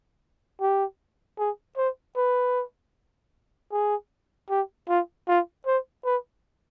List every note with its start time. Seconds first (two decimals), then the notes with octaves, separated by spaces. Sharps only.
0.61 G4
1.38 G#4
1.77 C5
2.16 B4
3.72 G#4
4.49 G4
4.88 F4
5.28 F4
5.66 C5
6.05 B4